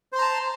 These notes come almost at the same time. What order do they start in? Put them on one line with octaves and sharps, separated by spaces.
C5 C6 A#5 A5